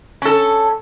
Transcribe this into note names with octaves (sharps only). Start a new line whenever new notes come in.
C#4 A4